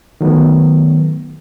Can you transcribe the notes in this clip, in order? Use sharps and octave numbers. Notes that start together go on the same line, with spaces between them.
D#3 F#3 A3 B3